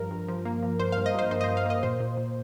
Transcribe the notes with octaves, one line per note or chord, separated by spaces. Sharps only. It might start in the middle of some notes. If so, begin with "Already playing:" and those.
Already playing: G2 F3 A#4
G2
F3
A#3
F3
G2 C5
F5
G2
D#5
G2 C5
G2 C5
D#5
C5
G2
F5
A#3 D#5
A#2 C5
A#2
A#2